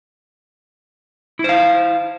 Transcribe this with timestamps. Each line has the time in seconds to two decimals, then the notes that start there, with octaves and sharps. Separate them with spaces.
1.39 E4
1.44 C5
1.49 F5